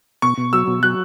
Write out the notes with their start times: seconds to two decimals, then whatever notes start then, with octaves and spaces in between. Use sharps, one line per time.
0.22 B2 C#6
0.38 B2
0.53 F#3 E6
0.67 B2
0.83 F#3 F#6